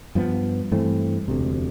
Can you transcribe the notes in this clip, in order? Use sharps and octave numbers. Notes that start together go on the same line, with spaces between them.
G2 F3 B3
G2 E3 A3 C4
E1 D2 C3